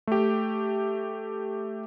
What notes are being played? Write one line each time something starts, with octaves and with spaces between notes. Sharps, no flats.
A3 G4